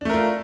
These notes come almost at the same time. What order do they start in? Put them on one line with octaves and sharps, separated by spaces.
D4 A3 A#4 F4